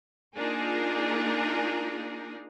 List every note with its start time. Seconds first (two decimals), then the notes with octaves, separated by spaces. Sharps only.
0.36 A#3 D4 D#4 F4 G#4 A#4